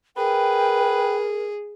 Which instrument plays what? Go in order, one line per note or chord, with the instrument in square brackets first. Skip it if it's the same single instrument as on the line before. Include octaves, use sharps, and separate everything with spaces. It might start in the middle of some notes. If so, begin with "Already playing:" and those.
[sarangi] G#4 [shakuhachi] A#4 [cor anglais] B4 [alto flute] G5